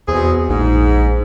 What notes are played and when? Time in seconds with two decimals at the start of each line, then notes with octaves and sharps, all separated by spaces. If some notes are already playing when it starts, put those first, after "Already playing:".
0.08 E2 B2 C4 G#4
0.49 A#1 G#2